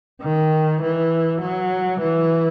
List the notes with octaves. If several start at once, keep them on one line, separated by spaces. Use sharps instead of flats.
D#3
E3
F#3
E3